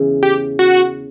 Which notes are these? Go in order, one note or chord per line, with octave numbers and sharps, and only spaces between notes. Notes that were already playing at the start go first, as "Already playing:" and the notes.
Already playing: E2 C#3 E3
G4
F#4